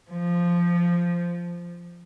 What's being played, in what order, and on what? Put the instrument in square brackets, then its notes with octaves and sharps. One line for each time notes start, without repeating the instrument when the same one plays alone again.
[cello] F3